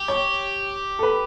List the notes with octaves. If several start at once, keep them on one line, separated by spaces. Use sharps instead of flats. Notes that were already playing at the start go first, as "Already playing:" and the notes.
Already playing: G4
C#5
A4
B4